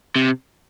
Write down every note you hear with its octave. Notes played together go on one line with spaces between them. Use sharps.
C3